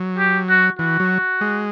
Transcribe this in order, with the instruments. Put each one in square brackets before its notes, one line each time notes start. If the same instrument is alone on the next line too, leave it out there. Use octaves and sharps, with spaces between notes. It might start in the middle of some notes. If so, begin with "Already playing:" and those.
Already playing: [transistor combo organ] F#3
[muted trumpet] G4
F#4
[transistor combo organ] E3 [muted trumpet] F#4
[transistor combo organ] F#3
G#3